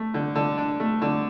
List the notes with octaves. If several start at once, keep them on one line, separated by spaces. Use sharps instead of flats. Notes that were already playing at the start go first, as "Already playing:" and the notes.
Already playing: A3
D3
D3
D4
A3
D3